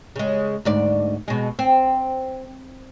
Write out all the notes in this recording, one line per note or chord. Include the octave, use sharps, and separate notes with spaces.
C#3 G#3
D2 G#2 D5
B2 G#3
C4